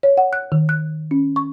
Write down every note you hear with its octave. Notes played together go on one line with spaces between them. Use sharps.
C#5
F#5
F#6
D#3
F#6
C#4
C#6